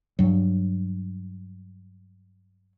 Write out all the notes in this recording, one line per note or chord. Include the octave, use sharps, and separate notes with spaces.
G2 F#3